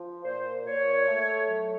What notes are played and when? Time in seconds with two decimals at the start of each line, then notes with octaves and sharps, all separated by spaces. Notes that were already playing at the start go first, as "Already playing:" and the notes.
Already playing: F3
0.24 A#2 C5
0.65 A#2 C#5
1.07 A3
1.48 F#3